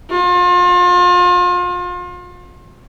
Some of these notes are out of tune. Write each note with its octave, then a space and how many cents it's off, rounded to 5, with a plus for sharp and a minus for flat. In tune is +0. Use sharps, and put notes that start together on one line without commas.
F4 +35